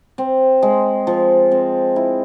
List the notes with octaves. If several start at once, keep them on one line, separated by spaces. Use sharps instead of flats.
C4
G#3
F3
C4
E4